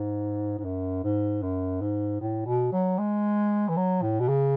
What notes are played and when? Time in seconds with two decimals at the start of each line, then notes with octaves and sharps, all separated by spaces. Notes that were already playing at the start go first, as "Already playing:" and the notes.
Already playing: G#2
0.58 G#2
0.65 F#2
1.04 G#2
1.43 F#2
1.81 G#2
2.21 A2
2.46 B2
2.73 F#3
2.99 G#3
3.68 E3
3.77 F#3
4.02 A2
4.20 B2
4.28 C#3